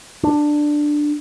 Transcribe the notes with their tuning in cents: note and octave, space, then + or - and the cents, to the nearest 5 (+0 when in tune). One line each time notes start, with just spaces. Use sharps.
D4 +10